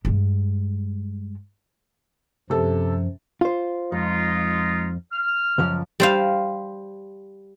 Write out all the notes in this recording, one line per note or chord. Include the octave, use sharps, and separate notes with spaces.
G2 G#3
F#2 C3 F3 A4
F4 C5
F2 G#3 D#4 F4
F6
C#2 F#2 F3
G3 C5 F5